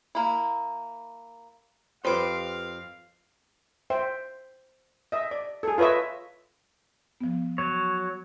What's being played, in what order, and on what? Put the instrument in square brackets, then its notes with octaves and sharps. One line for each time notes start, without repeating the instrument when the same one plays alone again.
[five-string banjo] A#3 E4
[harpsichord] F2 D6 [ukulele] G4 B4 [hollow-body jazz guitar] C5 [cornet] F5
[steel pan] C5 E5 G5
D#5 E5
D5
G#4 A4
F4 B4 C#5 D#5 E5
[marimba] F3 B3
[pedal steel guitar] F#3 C#5